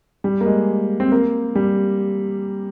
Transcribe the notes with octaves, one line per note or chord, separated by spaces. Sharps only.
G3
A#3
G#3
C4
A#3
G3